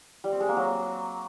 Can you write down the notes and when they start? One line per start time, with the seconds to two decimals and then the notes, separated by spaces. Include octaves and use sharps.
0.24 G3
0.32 C4
0.40 G#3
0.49 A#3
0.57 F#3